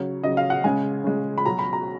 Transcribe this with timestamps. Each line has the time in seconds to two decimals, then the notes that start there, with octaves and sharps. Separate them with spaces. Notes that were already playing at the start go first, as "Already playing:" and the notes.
Already playing: C#3 F#3 C#5
0.24 C#3 F#3 D#5
0.37 F5
0.50 F#5
0.64 C#3 G#3 G#5
1.04 C#3 G#3
1.38 B5
1.46 B2 F#3 A#5
1.59 B5
1.73 A#5